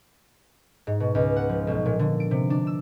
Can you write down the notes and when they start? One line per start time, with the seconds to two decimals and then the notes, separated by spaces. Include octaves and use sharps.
0.87 G#2
1.00 B2
1.15 C#2
1.36 F#5
1.49 F3
1.67 B1
1.86 A#2
1.99 D3
2.20 D7
2.31 C3
2.50 D4
2.67 E6